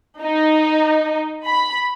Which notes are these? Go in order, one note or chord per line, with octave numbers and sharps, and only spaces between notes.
D#4
B5